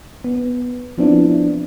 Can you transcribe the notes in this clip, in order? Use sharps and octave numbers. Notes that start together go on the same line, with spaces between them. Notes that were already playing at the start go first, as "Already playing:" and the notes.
B3
F3 B3 C4 D4 E4